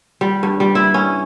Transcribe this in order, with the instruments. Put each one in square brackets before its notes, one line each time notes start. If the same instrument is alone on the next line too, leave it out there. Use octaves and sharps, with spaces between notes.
[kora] G3
G2
G3
E4
C#4